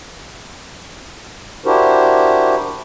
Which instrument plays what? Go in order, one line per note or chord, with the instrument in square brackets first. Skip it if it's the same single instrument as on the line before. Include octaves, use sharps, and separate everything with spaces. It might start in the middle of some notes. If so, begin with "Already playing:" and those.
[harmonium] D4 E4 F#4 G4 A#4 C5